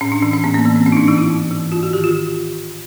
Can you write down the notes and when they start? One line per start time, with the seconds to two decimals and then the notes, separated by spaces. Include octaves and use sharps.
0.01 A2 C#4
0.12 D4
0.22 E3 C#4
0.33 C#4
0.44 A2 B3
0.54 A#3
0.65 E3 A#3
0.76 C4
0.86 G#2 C#4
0.92 D#4
0.97 D4
1.08 E3 D#4
1.18 E4
1.29 G#2
1.51 E3
1.72 G#2 F4
1.83 F#4
1.93 D#3 G4
2.04 F4